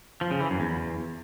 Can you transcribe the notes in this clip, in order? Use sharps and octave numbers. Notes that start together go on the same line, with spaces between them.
F3
C#3
E3
F#2
E2